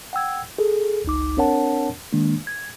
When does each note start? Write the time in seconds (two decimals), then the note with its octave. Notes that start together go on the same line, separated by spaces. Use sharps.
0.13 F#5 G5 E6 G#6
0.58 G#4 A4
1.05 G1 C#2 D#4 D6
1.37 C4 D4 A#4 C#5 F#5 A5
2.13 D#3 G#3 A#3 D4
2.47 G#6